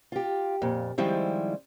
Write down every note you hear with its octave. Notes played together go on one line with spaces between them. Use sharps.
F4 G4
F2 A#2
D#3 F3 G3 G#3 C4 E4